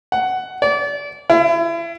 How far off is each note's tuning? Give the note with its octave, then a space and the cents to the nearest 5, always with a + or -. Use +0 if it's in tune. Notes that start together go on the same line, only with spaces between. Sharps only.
F#5 +10
D5 -30
E4 +35